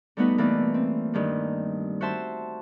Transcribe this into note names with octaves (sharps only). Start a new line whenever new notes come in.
G3 A3 B3 D#4 F#4 B4
B2 E3 A3 A#3 B4 D5
C4
G2 D#3 G3
F#4 C5 E5 A5 C6